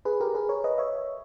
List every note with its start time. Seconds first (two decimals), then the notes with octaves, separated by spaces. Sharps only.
0.05 G#4 B4
0.20 G4 A#4
0.35 G#4 B4
0.49 A#4 C#5
0.64 B4 D#5
0.78 C#5 E5